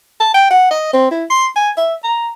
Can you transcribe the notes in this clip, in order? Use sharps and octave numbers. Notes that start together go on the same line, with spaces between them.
A5
G5
F#5
D#5
C4
E4
C6
G#5
E5
A#5